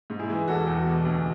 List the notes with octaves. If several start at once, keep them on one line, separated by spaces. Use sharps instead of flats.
G#2
E4 G#4
E3
E1 F#4 A4
E2
B2
D2